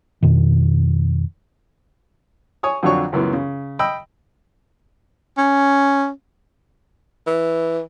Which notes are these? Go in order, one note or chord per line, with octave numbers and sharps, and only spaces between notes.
F2 B2 D#3
C#5 G#5 D#6
F2 D3 F#3 D4 C#5 C#6
C#2 F#2 E3 B3
C#3
D#5 G5 B5 E6
C#4
E3